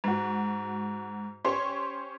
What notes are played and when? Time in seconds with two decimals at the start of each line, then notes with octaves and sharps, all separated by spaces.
0.04 G#2 F#4
1.45 C#4 G4 C5 C#5 C6